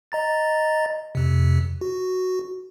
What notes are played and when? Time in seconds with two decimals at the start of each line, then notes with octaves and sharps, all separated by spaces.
0.12 D#5 A#5 A6
1.15 F2 C3
1.81 F#4